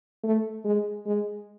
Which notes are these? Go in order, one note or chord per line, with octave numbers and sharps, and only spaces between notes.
A3
G#3
G#3